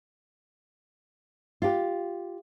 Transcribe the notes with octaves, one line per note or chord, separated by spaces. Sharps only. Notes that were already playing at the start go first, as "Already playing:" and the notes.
F4 G4